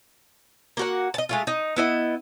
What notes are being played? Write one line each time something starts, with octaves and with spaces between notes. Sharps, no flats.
A#3 F#4 F#5
D#5 A5
G#3 A3 F4
D#4
B3 E4 D#5